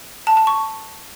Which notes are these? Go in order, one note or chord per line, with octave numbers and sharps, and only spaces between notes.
A5
A5
C#6